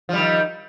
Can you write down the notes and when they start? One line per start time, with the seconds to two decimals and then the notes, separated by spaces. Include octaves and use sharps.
0.09 F3
0.13 G3
0.18 D#3